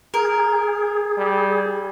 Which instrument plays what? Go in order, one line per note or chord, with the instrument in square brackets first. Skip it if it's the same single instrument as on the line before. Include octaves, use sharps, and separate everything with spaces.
[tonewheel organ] G#4 [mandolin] A#4
[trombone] G3